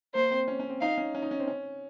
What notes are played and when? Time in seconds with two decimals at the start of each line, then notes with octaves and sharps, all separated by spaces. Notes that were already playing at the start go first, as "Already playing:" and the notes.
0.15 A#3 C5
0.31 C4
0.48 C#4
0.59 C#4
0.70 C4
0.81 D#4 F5
0.98 C#4
1.15 C#4
1.22 D#4
1.31 C#4
1.40 C4
1.48 C#4